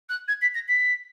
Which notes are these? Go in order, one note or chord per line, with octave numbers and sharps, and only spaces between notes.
F#6
G#6
B6
A#6
B6